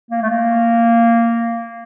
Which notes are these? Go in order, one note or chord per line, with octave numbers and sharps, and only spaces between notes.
A#3
A3
A#3